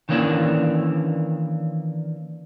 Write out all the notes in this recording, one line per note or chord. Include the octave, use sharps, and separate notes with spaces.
D#3 E3 A#3 C#4 D4